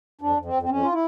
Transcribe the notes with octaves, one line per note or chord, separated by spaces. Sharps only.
F2 D4
F2
C4
F2
C4
F2 C#4
F4
E4